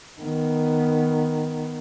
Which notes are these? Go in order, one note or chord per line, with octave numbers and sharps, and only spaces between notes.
D#3 B3